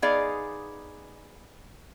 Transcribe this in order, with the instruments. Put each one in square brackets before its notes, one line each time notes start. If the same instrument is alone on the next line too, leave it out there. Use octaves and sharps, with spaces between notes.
[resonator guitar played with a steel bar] B3 D#4 G#4 D5 F5